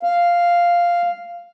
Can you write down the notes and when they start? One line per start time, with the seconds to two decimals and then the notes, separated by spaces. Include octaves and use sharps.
0.03 F5